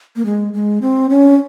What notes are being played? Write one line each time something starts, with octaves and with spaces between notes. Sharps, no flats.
A#3
G#3
G#3
C4
C#4